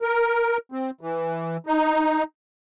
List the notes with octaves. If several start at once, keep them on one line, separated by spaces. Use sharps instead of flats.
A#4
C4
E3
D#4